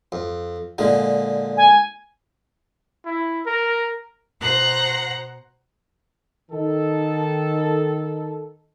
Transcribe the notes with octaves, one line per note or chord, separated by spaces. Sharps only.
F2
A#2 D3 G#3
G#5
E4
A#4
B2 C5 F#5 A#5 F#6
D#3 A4